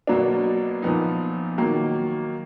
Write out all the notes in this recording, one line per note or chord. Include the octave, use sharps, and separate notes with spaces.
B2 F#3 A#3 D4
A#2 F3 B3 D#4
D#3 F#3 A#3